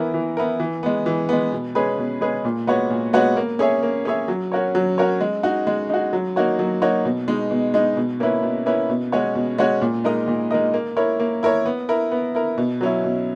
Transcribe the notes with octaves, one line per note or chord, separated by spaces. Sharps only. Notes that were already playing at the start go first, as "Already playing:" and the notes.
Already playing: E3 B3 E4 A#4
E3
B3 E4 A#4
E3
G#3 B3
E3
G#3 B3
B2
G#3 C#4 G#4 B4
B2
G#3 C#4 G#4 B4
A#2
G#3 B3 F#4 C#5
A#2
G#3 B3 F#4 C#5
A#3
C#4 G#4 C#5 E5
A#3
C#4 G#4 C#5 E5
F#3
C#4 F#4 A#4 C#5
F#3
C#4 F#4 A#4 C#5
G#3
D#4 F#4
G#3
D#4 F#4
F#3
A#3 D#4 F#4 C#5
F#3
A#3 D#4 F#4 C#5
B2
G#3 D#4
B2
G#3 D#4
B2
A#3 C#4 E4 B4
B2
A#3 C#4 E4 B4
B2
G#3 C#4 F#4 C#5
B2
G#3 C#4 F#4 C#5
A#2
G#3 D#4 A#4 D#5
A#2
G#3 D#4 A#4 D#5
A#3
E4 A#4 C#5
A#3
E4 A#4 C#5
B3
E4 A#4
B3
E4 A#4
B2
F#3 C#4 E4
B2